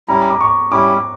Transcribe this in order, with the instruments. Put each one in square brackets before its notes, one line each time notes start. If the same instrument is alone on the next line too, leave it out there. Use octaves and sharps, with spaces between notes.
[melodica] G3 C#4 E4 [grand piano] A#5
[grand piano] D6
C#6
[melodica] G3 C#4 E4 [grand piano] D6